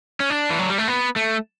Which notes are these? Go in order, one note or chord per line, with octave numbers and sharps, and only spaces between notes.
C#4
D4
E3
F#3
G3
A3
B3
A3